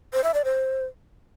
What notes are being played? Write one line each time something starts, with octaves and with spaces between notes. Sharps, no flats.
C5
E5
D5
C5